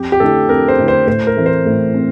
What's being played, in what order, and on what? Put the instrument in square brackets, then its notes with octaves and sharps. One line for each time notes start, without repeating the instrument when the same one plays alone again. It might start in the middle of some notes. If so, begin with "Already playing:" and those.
Already playing: [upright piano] F2 [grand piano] G4
[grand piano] G4
[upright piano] D3 A3 E4 [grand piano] A4
[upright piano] F2 [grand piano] A#4
[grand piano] C5
[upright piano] D3 A3 E4
[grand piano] C5
[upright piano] A2 [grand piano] C5
[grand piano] A#4
[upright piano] E3 A3 C4
[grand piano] C5
[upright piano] A2
C4